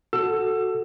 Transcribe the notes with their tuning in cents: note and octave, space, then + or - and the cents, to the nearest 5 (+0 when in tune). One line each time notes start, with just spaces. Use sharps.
F#4 +0 A4 +0 E6 +25